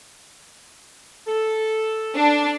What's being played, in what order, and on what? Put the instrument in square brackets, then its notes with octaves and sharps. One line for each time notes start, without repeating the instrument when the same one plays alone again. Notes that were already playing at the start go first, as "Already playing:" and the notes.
[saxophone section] A4
[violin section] D4